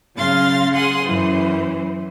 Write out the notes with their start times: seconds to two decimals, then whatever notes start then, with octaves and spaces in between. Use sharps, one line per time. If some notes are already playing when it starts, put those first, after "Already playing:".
0.16 C#3 F#3 F5 C6 A6 A#6
0.74 G#4 F#5 C6 D#6 F#6
1.03 F#2 E3 C5